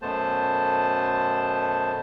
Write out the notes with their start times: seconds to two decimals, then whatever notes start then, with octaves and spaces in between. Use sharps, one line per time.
0.02 F#2 B2 A3 B3 C5 A5